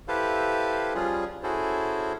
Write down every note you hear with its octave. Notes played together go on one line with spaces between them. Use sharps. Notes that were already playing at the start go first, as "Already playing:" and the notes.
E4 G4 A4 B4 C5 F5
F3 G3 C#4 F4 G#4
C#4 E4 F#4 G#4 A4 C5